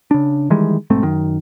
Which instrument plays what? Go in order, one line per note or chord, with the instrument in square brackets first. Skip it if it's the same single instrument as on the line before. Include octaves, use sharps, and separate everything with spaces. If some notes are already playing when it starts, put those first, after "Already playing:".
[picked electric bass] C#3 D4
D#3 E3 G3 G#3
B1 G#2 A3 C4
F#2 D#3